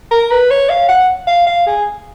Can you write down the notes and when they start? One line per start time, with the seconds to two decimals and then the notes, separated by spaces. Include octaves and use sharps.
0.11 A#4
0.31 B4
0.51 C#5
0.70 F5
0.88 F#5
1.27 F5
1.47 F5
1.67 G#4